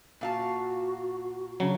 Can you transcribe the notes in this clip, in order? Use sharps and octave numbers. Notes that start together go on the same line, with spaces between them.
A#2 F#4 F5 A5
C#3 F#3 D4